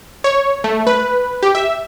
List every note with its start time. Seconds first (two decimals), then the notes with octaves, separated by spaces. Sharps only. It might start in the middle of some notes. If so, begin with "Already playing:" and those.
0.24 C#5
0.64 A3
0.87 B4
1.43 G4
1.55 E5